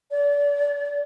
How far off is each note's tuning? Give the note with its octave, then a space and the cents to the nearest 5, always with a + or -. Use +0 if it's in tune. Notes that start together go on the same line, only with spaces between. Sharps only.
D5 -35